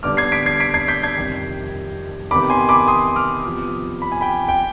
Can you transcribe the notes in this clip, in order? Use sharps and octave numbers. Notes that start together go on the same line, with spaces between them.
D3 G3 B3 D6 F6
G#6 C7
B6 D7
G#6 C7
B6 D7
G#6 C7
G6 B6
G#6 C7
F2 C3 D#3 G3
C3 D#3 B3 B5 D6
G#5 C6
B5 D6
C6 D#6
D6 F6
C3 F3 B3
B5
G#5
G5 B5
G5